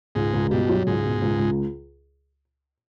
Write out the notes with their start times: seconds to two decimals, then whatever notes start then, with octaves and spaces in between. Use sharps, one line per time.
0.15 C#2 G#2
0.33 C#2
0.51 G2 B2
0.69 F#3
0.86 C#2 G#2
1.04 B2
1.22 C#2
1.39 C#2